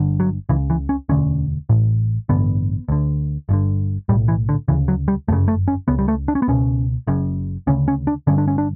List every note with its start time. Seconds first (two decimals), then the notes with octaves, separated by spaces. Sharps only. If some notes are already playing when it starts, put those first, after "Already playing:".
Already playing: G1 G2 D3
0.20 F#3
0.49 C#2 C#3 E3
0.70 E3
0.89 C#4
1.09 E1 D2 D3 C#4
1.69 A1 A2
2.29 A1 G2 D3 B3
2.89 D2 D3
3.49 G1 G2 D3
4.09 A2 G3
4.12 B1
4.28 E3
4.49 D3
4.68 D2 C#3 E3
4.88 F#3
5.08 G3
5.28 G1 F#2 C#3 A3
5.48 A3
5.68 C#4
5.88 C#2 C#3 B3
5.99 G3
6.08 A3
6.28 D4
6.35 C#4
6.42 B3
6.48 C#2 B2 C#4
7.07 F#1 F#2 C#3
7.67 D2 C#3 C#4
7.88 C#4
8.07 D4
8.27 G1 G2 D3 C#4
8.38 D4
8.48 C#4
8.58 D4